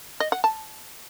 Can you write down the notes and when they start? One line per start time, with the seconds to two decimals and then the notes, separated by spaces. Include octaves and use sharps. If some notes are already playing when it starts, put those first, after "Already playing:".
0.20 D#5
0.32 F#5
0.44 A5